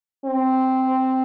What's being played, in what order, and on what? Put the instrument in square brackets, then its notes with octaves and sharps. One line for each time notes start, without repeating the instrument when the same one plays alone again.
[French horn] C4